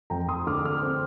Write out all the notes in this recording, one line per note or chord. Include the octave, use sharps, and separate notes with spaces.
F2 G5 A#5
C6 D#6
D3 D6 F6
D6 F6
C4